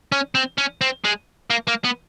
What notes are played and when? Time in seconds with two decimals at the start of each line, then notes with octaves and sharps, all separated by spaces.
0.12 C#4
0.35 C4
0.58 C#4
0.81 C4
1.04 G#3
1.50 A#3
1.68 A#3
1.85 B3